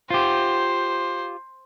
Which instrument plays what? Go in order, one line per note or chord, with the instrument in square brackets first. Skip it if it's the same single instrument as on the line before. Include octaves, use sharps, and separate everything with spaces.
[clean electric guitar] F4 G4 [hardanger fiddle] C5